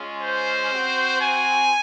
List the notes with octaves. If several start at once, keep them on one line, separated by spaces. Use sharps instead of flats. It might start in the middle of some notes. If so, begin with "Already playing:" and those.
Already playing: G#3 C#4 F4
C5
C4 F#4
G#5